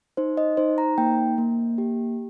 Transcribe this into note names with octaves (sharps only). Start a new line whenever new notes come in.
D#4 C5
D#5
D#4 C5
A#5
A#3 G5
A#3
G4